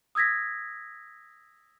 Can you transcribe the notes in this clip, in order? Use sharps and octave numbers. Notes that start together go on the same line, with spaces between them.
D#6 E6 G#6 A#6 B6